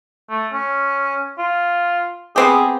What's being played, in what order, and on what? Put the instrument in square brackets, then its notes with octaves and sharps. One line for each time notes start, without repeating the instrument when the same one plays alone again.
[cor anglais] A3
C#4
F4
[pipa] B3 C4 G4 [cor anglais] G#4